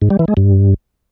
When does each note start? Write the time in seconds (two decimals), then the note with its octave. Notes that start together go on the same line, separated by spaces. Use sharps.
0.02 G#2
0.10 G3
0.19 E3
0.28 G#3
0.37 G2